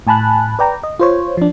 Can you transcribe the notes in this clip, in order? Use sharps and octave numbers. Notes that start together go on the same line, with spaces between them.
A2 G#5 A5 B5 F#6
B4 D5 G5 A#5
D#5
F4 C5 C#5
F3 D4